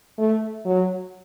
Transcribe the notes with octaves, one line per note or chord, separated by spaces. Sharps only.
A3
F#3